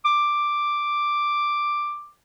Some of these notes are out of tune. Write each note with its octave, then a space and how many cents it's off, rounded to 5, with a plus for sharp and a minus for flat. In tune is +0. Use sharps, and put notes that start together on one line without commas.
D6 +5